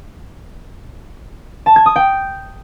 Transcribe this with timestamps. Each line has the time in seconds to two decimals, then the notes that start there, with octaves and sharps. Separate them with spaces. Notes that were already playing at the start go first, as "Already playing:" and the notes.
1.66 A5
1.76 G#6
1.86 D#6
1.96 G5